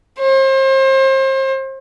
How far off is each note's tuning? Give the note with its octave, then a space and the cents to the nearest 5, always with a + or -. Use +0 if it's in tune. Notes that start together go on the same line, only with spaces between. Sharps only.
C5 +35